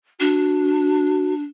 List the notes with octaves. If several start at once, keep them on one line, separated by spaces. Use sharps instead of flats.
D4 F#4